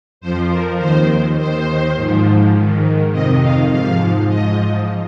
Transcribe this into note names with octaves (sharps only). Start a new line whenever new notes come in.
F2 F3 C5
A#4
D#2 D#3 C5
D#2 D#3 C5
G#2 F3
G#2 D#3
F2 C3 D#3 D#5
F5
G#2 F3 F5
G#2 F3 D#5